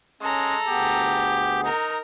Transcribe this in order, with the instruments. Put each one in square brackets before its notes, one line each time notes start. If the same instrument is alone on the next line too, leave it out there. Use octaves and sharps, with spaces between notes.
[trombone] G#3 [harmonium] C#4 [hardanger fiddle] A4 A#5
[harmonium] D2 B3 G#4 [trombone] G4
[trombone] D#4 [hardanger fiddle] A#4